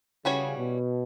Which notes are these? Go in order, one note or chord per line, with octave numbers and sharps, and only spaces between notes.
C#3 E3 G3 C#4 F#4 C#5
B2